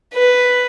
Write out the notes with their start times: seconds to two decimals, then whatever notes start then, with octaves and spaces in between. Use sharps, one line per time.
0.14 B4